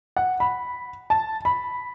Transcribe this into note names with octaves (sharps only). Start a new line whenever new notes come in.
F#5
B5
A5
B5